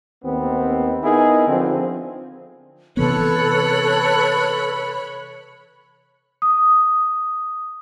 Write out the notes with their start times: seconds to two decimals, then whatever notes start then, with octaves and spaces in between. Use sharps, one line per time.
0.24 D#2 D#3 B3 C4
1.03 B3 D#4 E4 G#4 A#4
1.48 D3 F3 C4
2.97 C3 E3 B3 A4 B4 C#5 B5 F#6
6.42 D#6